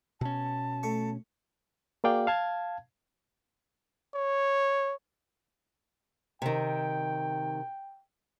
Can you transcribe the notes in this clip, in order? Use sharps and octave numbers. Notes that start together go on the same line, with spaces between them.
B2 C#4 A5
A3 C#6
A#3 F#4 G#4 D5 F5 G5
F5 A5 G#6
C#5
C3 D#3 G5